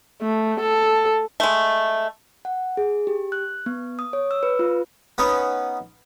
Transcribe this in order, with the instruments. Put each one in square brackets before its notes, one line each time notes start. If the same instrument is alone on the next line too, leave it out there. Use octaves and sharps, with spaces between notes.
[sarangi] A3
A4
[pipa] G#3 A3
[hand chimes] F#5
G#4
G4
F#6
B3
D#6
C#5
E6
B4
F4
[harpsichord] B3 C#4 D#4